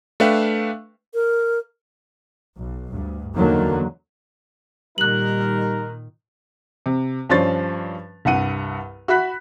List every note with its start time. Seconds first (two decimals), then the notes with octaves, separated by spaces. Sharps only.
0.20 A3 D4 B4 E5 F5 G5
1.14 A#4
2.56 B1
2.92 D2 G2
3.35 E2 D3 D#3 F#3 A#3
4.98 A#2 D#3 G3 D#4 A#4 F#6 F#7
6.86 C3
7.29 G2 F3 C#4 D4 C6 A6
8.25 C2 G2 F#5 D#7
9.08 F#4 E5 B5 F#6 B6